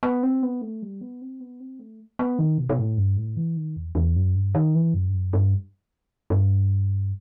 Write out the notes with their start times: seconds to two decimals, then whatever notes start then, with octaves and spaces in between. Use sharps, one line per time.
0.03 B3
0.23 C4
0.43 B3
0.62 A3
0.82 G3
1.01 B3
1.22 C4
1.40 B3
1.60 C4
1.79 A3
2.19 B3
2.39 D#3
2.58 B2
2.69 B2
2.78 A2
2.97 G2
3.17 A2
3.37 E3
3.57 D#3
3.76 E2
3.95 E2
4.16 F#2
4.35 G2
4.55 D#3
4.75 E3
4.94 F#2
5.08 G2
5.13 F#2
5.33 G2
6.30 G2